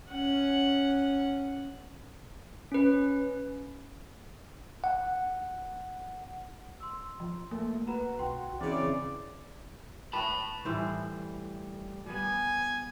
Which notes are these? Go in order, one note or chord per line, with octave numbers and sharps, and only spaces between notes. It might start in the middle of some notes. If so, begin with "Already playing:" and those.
C#4 F#5
C#4 B4
F#5
C6 E6
F3
A3 A#3
F#4 B4 A#5 B5
B1 G5 C6
C#3 E3 C4 D5
B4 A5 B5
A2 E3 G3 C5
G3 B3 G#5